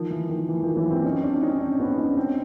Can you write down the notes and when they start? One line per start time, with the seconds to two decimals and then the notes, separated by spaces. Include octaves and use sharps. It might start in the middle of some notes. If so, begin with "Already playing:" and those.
Already playing: D#3 F3
0.10 E3
0.29 D#3
0.49 E3
0.63 D#3 F3
0.76 E3 F#3
0.90 A#3 C4
1.04 C#4 D#4
1.23 C4 D4
1.41 C#4 D#4
1.61 C4 D4
1.80 B3 C#4
1.90 D4
1.97 C#4 D#4
2.17 C4 D4